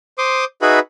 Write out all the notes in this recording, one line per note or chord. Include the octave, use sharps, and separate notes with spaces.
C5 C6 D6 D#6
D#4 F#4 G#4 B4 E5 B5